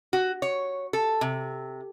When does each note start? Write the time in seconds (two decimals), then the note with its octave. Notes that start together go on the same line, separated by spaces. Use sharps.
0.13 F#4
0.42 C#5
0.93 A4
1.21 C3